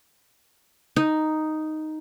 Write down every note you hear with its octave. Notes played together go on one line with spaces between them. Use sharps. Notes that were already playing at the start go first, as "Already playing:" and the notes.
D#4